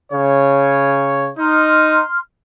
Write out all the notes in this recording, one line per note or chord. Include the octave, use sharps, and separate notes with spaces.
C#3 C#5
D#4 C6 F6